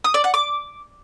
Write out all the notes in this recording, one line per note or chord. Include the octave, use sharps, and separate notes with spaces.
D#6
D5
F#5
D6